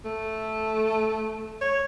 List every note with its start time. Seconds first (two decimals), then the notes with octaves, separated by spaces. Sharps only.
0.05 A3
1.61 C#5